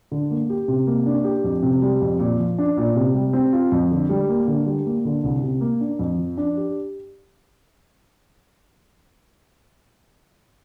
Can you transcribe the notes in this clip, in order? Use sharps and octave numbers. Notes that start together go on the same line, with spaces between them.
D3
A#3
G4
C3
A#3
D4
G4
F2
C3
G3
F2
A#2
F3
D4
A#2
C3
G3
C4
F4
F2
D3
G3
A#3
D3
G3
A#3
D3
C2
C3
A#3
D4
F2
F3
D4
G4